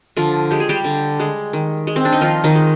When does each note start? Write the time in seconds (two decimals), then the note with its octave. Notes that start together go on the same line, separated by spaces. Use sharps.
0.17 D3 F3 F4
0.51 G#3 G4
0.60 G#4
0.69 G3 G4
0.84 D3
1.20 G#3
1.53 D#3
1.87 G#3
1.96 C4
2.05 D4
2.13 D#4
2.20 D#3 F3 F4
2.44 D#3 D#4
2.55 G#3